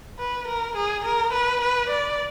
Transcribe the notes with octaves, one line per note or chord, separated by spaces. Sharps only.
B4
A#4
G#4
A#4
B4
B4
D5